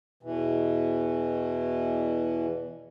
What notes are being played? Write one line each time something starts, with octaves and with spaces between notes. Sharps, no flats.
E2 B2 E3